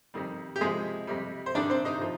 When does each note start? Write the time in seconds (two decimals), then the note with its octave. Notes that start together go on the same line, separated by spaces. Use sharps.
0.14 F2 D#3 G3
0.56 G4
0.61 F2 C3 F3 G#3 G#4
1.07 F2 C3 G3
1.46 C5
1.54 G2 D#3 G3 D4 D5
1.70 C4 C5
1.85 D#4 D#5
2.02 F3